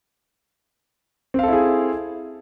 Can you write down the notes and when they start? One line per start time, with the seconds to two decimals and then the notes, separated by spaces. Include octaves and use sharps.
1.34 C4
1.39 F5
1.43 A4
1.48 E4
1.53 G#4